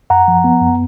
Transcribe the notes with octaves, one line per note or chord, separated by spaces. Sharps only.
F#2 F#5 A#5
F3
B3
F#2